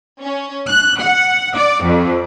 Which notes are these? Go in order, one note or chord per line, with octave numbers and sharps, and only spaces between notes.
C#4
F#6
F#5
D5
F2